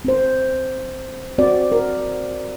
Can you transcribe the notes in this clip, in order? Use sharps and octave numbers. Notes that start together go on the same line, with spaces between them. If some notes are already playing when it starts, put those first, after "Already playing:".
C4 C5
C4 F#4 D5
A#4